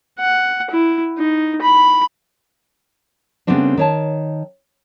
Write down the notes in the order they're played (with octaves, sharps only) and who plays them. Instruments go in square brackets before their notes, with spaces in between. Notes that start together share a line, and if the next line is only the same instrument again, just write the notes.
[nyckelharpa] F#5
E4
D#4
B5
[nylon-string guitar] C#3 G3 A3 B3 C4 D4
D#3 C#5 A5